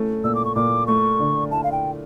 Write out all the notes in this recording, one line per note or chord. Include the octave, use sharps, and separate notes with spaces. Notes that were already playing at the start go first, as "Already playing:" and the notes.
Already playing: A3 C#4
A#2 E6
D6
C#6
A#2 D6
A3 C#6
D3
E4 A5
F5
G5